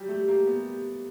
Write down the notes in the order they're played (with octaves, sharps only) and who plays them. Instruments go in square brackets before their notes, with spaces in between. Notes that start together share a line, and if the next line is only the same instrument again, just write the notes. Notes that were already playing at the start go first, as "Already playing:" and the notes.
Already playing: [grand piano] F#3 G3 [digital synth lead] G4
[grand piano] A3
A#3
B3